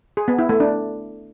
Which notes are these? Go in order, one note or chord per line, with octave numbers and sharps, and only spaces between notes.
G#4
B3
E4
A3
D4